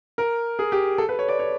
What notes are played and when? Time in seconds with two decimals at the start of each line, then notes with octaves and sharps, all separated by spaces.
0.18 A#4
0.59 G#4
0.72 G4
0.98 A4
1.09 B4
1.19 C#5
1.28 D5
1.39 C#5